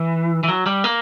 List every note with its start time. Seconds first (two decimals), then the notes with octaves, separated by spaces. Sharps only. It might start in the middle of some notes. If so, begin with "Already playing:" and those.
Already playing: E3
0.43 E3
0.48 F#3
0.66 G3
0.84 A#3